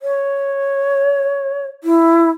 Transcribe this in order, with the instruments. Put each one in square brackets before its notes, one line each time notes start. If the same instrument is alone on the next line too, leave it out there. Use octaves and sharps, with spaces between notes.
[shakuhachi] C#5
E4